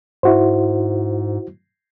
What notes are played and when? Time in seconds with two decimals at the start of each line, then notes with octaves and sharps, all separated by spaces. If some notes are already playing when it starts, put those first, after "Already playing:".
0.23 G#2 E4 F#4 C5